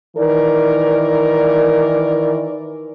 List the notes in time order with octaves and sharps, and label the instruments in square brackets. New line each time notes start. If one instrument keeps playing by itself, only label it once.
[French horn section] D#3 E3 A#4 D5